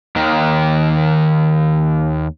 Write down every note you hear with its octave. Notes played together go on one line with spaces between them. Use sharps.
D#2 D#3